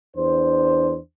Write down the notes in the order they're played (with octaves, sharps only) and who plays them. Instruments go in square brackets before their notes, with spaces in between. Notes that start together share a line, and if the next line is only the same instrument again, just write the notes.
[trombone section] E2 D4 C5